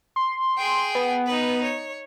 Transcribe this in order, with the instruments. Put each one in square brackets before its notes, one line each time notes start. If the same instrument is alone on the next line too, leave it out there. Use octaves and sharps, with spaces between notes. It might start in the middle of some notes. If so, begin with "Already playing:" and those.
[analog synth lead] C6
[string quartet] G#4 G5
[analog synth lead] B3
[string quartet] D#4 B4
C#5